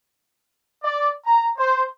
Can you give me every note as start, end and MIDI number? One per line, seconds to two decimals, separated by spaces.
0.83 1.10 74
1.26 1.47 82
1.56 1.83 72